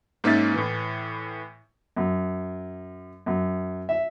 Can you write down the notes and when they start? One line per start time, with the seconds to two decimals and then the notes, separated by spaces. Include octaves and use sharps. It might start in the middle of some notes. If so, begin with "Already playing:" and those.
0.24 G#2 A#3 C#4 D#4 E5 A6
0.54 A2 E3
1.97 F#2
3.26 F#2
3.89 E5